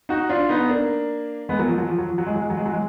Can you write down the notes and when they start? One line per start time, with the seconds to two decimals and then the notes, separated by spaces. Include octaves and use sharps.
0.09 D#4 F#4
0.29 D4 F4
0.49 B3 D#4
0.69 A#3 D4
1.49 G#3 B3
1.59 F#3 A#3
1.68 F3 G#3
1.78 F#3
1.89 F3
1.98 F#3
2.09 F3
2.18 F#3
2.27 G#3
2.34 F#3
2.42 G#3
2.50 F#3
2.57 G#3
2.66 F#3
2.73 G#3